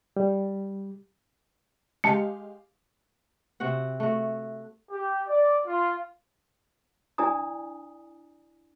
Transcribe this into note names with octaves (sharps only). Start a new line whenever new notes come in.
G3
G#3 G4 F5 A5 C#7
C3 C4 F#4 F#5
A3 F#4
G4
D5
F4
D4 E4 D5 G#5 A#5 D#6